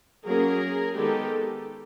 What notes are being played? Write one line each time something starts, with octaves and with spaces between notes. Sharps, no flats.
F#3 A#3 C#4 G#4 A#4
D#3 G#3 B3 D#4 G4 A4